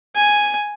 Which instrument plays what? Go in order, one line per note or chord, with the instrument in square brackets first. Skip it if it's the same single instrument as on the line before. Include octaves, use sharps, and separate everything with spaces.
[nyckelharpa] G#5